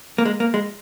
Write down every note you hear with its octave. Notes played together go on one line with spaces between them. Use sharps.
A#3
G#3
A#3
G#3